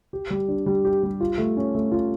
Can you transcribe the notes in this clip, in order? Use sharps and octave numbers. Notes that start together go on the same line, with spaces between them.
G4
G3
D4
G3
G4
G3
F4
A3
C#4
A3
F4